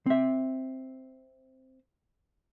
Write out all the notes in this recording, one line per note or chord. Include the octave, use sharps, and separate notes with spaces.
C4 E5